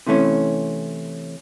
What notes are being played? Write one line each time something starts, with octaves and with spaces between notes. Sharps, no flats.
C3 E3 A3 C#4